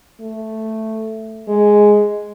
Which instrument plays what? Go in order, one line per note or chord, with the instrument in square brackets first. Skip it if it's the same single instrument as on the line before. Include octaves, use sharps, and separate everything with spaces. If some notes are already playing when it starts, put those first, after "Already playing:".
[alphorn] A3
G#3